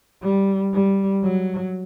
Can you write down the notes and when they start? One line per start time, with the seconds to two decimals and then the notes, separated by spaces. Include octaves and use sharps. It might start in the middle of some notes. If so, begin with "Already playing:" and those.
0.23 G3
0.73 G3
1.24 F#3